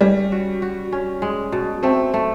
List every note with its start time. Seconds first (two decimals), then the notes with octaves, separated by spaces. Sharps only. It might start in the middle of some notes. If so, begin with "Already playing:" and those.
0.01 G3 C#4
0.32 F#4
0.62 F#4
0.92 C#4
1.22 G#3
1.52 B2
1.83 A3 C4
2.14 A3